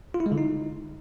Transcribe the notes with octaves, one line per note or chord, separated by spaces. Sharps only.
F4
E4
G#3
D3
D#4